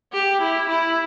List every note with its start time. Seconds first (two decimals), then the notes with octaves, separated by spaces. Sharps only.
0.13 G4
0.41 E4
0.69 E4